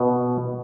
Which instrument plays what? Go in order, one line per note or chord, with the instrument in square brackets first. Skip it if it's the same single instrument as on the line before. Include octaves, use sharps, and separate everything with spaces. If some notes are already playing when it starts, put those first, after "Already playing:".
Already playing: [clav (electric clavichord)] B2